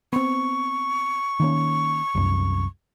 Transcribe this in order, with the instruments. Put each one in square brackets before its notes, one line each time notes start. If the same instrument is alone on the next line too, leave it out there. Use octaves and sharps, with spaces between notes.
[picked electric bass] B3 C4 [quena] C#6
[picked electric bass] D#3 A#3 C#4
C2 F#2